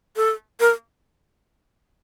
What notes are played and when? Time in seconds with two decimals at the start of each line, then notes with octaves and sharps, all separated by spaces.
0.16 A4
0.60 A#4